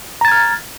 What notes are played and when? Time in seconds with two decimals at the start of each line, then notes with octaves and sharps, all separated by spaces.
0.21 A#5
0.25 A6
0.28 G#6
0.32 F6